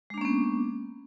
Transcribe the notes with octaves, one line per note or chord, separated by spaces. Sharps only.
G#3 A#3 B3 C#4 D4